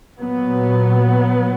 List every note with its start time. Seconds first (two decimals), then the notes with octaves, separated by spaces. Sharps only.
0.18 A#2 F#3 B3